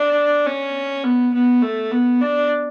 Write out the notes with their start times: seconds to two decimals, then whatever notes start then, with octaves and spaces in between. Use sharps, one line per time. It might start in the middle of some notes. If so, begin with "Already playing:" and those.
Already playing: D4
0.46 C#4
1.04 B3
1.34 B3
1.62 A3
1.92 B3
2.21 D4